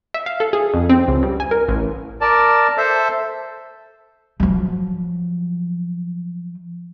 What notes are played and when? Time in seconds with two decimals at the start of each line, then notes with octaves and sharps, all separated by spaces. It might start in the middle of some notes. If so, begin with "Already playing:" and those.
0.14 E5
0.26 F5
0.40 A4
0.53 G#4
0.74 F2
0.89 C4
1.08 C#2
1.23 G2
1.40 G#5
1.51 A#4
1.68 A1
2.21 A#4 D5 A5
2.78 A4 C5 E5
4.40 F3 F#3